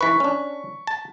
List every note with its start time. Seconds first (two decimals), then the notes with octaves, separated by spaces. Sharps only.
0.01 E3 B4 C#6 B6
0.20 C#4 D4
0.87 A5